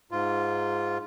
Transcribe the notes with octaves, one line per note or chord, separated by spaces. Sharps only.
G#2 F4